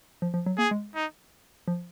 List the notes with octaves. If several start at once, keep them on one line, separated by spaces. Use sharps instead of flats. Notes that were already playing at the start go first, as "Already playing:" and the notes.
F3
F3
F#3
A#3 G#4
G#3
D#4
F3